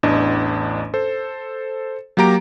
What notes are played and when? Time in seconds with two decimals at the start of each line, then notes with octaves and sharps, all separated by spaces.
0.03 A1 E2 D4 D#5
0.94 A4 C5
2.17 F#3 A#3 G4 A#5 D7